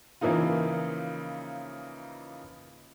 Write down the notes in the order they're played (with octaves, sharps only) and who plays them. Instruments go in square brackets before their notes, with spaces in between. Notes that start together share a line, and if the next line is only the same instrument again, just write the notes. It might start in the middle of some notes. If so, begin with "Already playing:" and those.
[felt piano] C#3 E3 F3 A#3 D#4 F4